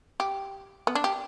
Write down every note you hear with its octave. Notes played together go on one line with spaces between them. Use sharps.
G4
B3
D4
G4